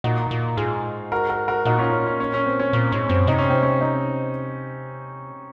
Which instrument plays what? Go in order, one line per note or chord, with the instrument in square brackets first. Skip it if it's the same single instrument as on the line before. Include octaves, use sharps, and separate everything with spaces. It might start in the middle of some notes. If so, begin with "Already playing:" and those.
[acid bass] A#2 [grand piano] D#4 F#4
[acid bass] A#2
[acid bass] G#2 [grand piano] F4 G#4
[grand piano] F#4 A#4
F#4 A#4
F#4 A#4
[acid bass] A#2 [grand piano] D#4 F#4
[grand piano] C#4 F4
C#4
C#4
C#4
C#4
C4
C#4
[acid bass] A#2 [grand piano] C#4
[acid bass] G#2 [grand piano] C#4
[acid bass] F#2 [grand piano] C4
[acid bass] C3 [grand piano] D#4
[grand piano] C#4
C4
C#4
C4 D#4